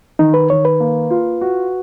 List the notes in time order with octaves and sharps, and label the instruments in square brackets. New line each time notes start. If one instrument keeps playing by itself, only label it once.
[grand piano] D#3 [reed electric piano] D#4
[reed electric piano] B4
[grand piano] D#3 [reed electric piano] C#5
[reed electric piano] B4
[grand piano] A#3
F4
F#4